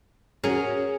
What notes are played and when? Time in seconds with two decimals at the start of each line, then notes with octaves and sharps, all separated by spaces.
0.44 C#4 F#4 G#4 A#4